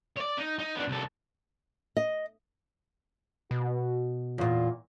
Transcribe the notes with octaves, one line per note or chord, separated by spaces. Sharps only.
C#5 D5
D#4
D#4
B3 D4
C2 A4
D#5
B2 F#4
E2 A#2 F4